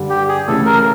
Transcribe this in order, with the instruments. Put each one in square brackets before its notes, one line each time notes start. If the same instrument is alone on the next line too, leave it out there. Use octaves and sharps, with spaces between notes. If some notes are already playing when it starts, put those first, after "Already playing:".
Already playing: [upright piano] G2 D3 G3
[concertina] G4
G#4
[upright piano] C#3 E3 A3 [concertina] A4
[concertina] A#4